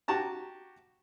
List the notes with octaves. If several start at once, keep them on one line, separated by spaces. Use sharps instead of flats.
F#4 G4 A5 A#5